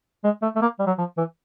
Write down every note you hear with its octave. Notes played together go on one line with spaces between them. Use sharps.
G#3
A3
A3
A#3
G3
F#3
F3
E3